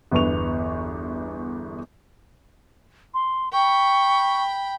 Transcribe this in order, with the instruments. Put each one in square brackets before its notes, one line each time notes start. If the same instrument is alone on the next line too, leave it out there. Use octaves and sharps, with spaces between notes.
[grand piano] G1 E2 B4 C#6 F7
[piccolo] C6
[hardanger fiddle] G5 B5 [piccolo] C#6